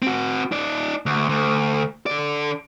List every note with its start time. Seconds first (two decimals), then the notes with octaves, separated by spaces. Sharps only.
0.02 C4 F#4
0.52 D#4 D5
1.06 D2
1.29 D2
2.06 D3 D5